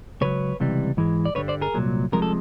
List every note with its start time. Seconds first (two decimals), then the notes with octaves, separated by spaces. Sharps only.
0.21 C#2 C#3 F#3 B4 C#5
0.60 C#2 C3 E3 G3
0.97 G#2 E3 G#3
1.25 D5
1.35 G2 D3 G3 B4 C#5
1.48 C5 D5
1.61 G#4 A#4
1.74 C2 A#2 F#3
2.12 C2 C3 F3 G#3 A#4
2.22 A4